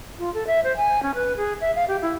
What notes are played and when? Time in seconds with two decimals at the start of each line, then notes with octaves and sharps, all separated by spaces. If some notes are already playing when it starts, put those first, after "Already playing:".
0.19 F4
0.34 A4
0.47 E5
0.64 C5
0.77 G#5
1.03 C#4
1.15 B4
1.37 G#4
1.61 E5
1.76 F5
1.88 G4
2.02 E4